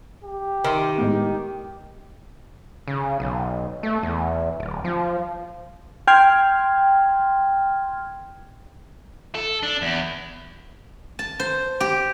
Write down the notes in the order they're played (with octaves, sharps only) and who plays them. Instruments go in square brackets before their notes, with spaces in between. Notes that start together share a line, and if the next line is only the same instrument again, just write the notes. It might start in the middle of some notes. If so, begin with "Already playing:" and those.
[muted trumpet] G4
[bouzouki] D#3 [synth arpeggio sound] E5 C6
[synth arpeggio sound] A2 G#3 B3
[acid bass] C#3
B1
A3
E2
D1
F3
[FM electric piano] G5 C6 F6 G#6
[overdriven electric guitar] A4
D4
E2
[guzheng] A5
C5
G4